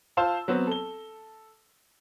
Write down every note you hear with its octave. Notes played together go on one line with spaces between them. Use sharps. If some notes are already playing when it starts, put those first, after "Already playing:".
F4 C5 F5 A5 E6
F#3 B3 C4
A4 G7